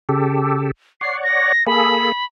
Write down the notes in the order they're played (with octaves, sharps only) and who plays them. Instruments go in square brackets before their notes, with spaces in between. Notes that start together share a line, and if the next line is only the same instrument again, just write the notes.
[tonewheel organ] C#3 G4 A4
[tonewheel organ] C#5 D5 F#5 [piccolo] C7
[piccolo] A#6
[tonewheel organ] A#3 G#4 A4 [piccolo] B5